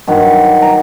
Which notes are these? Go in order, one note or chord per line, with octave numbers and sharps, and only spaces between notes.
G2 D#3 F#3 F#5
A#5